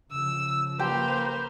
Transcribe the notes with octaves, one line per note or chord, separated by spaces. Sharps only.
C#3 F3 E6
A#3 G4 B4 C5 A#5